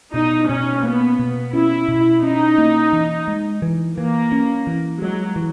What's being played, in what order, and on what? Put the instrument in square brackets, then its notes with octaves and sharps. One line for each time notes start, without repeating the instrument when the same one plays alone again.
[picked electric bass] B2 [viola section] D#4
[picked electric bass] B2 [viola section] C#4
[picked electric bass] A#3 [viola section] B3
[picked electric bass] B2
[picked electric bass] C#4 [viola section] E4
[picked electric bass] B2
[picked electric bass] C#4 [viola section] D#4
[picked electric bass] A#3
E3
G#3
E3
[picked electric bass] E3 [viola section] A#3
[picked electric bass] C#4
E3
[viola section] F#3 [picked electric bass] G#3
[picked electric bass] E3